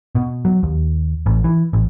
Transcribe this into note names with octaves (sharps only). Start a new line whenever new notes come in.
B2
F#3
D#2
A1
E3
A1